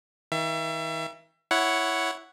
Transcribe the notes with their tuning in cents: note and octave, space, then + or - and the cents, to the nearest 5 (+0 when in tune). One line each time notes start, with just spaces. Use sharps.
D#3 +45 E5 +35
E4 +0 C#5 +5 F#5 +0